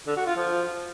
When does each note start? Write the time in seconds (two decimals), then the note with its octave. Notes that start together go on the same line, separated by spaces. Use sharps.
0.07 D3
0.17 F#4
0.26 F4
0.36 F3